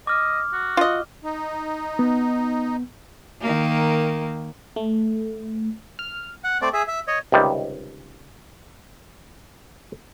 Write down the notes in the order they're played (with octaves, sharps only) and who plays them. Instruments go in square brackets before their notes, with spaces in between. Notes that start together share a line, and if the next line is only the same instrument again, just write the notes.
[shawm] D#5 [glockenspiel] D6 F6
[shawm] F#4
[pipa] F4 D#5
[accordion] D#4
[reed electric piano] B3
[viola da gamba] D#3 A#3
[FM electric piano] A3
F6
[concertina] F#5
A3 C4 D5
G#4 E5
E5
C#5 D#5
[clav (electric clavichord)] C#2 C3 D#3 G3